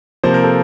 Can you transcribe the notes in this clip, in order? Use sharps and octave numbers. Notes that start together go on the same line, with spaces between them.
C3 F3 A#3 C5
A#4
A4